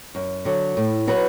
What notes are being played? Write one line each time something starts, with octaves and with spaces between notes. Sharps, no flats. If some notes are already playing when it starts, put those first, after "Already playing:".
F#2
D3 F#3
A2
F#3 B3 F#4 B4